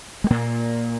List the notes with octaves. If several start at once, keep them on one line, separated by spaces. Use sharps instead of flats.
G#3
A#2 A#3